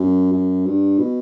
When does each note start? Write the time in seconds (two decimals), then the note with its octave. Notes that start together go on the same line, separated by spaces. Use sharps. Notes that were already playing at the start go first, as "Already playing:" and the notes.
Already playing: F#2
0.32 F#2
0.66 G2
0.99 B2